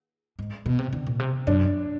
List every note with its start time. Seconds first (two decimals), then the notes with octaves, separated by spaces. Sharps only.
0.39 G#2
0.66 B2
0.79 C3
0.93 D3
1.07 A#2
1.19 C3
1.47 F#2 D4